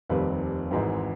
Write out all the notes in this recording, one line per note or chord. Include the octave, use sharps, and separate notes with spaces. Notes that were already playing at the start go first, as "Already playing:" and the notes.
F1 D#2 D#3 G3 C4 B4
G#1 G#2 E3 G#3 C4